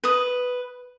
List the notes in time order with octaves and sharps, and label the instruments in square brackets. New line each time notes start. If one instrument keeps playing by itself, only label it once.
[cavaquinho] B4 D#6